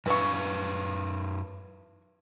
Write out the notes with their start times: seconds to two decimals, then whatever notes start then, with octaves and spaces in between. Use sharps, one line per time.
0.06 F#2 E3 B4 F5 C#6